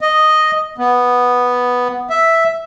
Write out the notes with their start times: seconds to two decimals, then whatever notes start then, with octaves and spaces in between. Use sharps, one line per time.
0.01 D#5
0.78 B3
2.10 E5